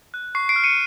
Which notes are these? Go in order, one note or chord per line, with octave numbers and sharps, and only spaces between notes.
F#6
C#6 C7
C7 D7
F6
C#7 D#7